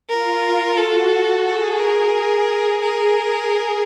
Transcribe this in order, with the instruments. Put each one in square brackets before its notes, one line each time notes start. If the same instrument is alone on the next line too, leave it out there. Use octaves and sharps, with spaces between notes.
[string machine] F4 [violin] A#4
[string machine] F#4 [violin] A4
[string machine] G#4 [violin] A4
[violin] A#4
A#4